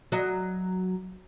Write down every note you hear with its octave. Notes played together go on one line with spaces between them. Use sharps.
F#3 D#5